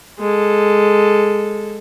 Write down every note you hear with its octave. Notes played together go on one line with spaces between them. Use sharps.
G#3 A4